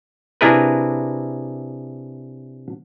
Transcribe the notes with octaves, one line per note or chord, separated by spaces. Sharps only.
C3 D4 E4 G#4 A#4 B4